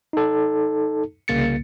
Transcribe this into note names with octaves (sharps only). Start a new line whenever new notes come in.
D#4 A4
C2 C#3 A#3 A6 C#7